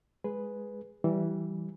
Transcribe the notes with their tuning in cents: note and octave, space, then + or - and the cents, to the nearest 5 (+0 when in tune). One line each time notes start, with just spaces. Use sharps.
G#3 +0 G#4 +0 B4 +0
E3 +0 G3 -20